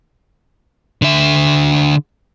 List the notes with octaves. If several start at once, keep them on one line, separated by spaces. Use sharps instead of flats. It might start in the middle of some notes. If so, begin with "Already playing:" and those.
D3 E5